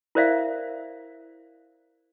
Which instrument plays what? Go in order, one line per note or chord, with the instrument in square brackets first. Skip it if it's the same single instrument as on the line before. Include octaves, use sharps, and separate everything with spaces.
[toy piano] E4 A#4 C5 D5 E5 F5